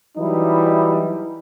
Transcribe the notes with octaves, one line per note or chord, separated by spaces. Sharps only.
E3 F#3 G3 D#4 E4